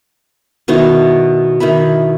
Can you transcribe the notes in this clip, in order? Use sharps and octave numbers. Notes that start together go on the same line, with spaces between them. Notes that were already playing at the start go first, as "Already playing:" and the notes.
B2 D#3 D#4 E4
D#3 D#4 E4 B5